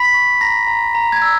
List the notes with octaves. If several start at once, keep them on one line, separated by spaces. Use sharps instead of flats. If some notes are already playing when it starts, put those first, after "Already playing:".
Already playing: B5 B6
C#6
A#5 A#6
A#5
A#5
G#6
E6